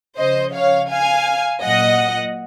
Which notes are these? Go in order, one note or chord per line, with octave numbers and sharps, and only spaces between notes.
C#3 F3 C5 D#5
C#5 F5
F5 G#5
A#2 F#3 D#5 F#5